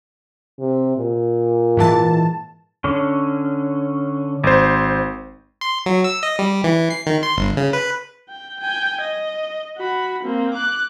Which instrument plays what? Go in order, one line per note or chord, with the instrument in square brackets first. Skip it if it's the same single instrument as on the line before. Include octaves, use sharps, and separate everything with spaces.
[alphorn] C3
A#2
[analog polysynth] G#2 E3 A5
[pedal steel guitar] D3 C#4
[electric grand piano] G#1 C5
[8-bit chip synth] C6
F#3
E6
D#5
G3
E3
C7
D#3
C6
G1
C#3
B4
[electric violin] G5
G5 G#5
D#5
F#4 B5
A#3 C4
D6 F#6